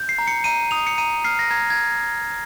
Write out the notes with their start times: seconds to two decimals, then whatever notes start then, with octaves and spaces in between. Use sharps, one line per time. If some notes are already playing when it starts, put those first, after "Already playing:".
Already playing: G6
0.09 C7
0.18 A#5
0.27 C#7
0.44 A#5 D#7
0.71 D#6 F7
0.87 C#7
0.98 A#5 D#7
1.24 F6 C7
1.39 A#6
1.51 A#5 G#6
1.70 G#6